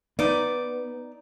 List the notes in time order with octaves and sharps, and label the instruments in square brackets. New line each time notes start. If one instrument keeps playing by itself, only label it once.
[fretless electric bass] B3 [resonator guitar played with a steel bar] D#4 D5